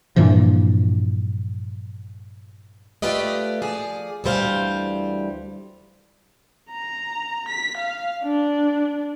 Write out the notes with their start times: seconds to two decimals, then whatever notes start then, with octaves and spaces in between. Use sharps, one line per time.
0.16 G2 A#2 E3 F3
3.02 A3 F4 G4 B4 D5 D#5
3.62 F3 G#4 D5
4.24 D2 E3 G3 C5 F5
6.71 A#5
7.48 B6
7.77 F5
8.23 D4